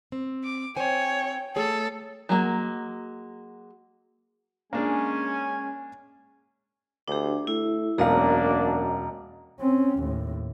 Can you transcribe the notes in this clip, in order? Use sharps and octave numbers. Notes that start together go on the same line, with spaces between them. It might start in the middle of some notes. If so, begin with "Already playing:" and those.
C4
D6
C4 C5 C#5 G5 G#5
A3 G#4 A4 C#5
F#3 G#3 A#3
G#3 A#3 C#4 D4 G#4 G#5
D2 D4 G4
A3 E4
E1 F#2 A#3 D4 D#5 F5 A#5
C4 C#4
D#2 A2